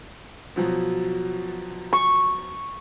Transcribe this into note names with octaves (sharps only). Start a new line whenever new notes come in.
B2 F3 F#3
C#6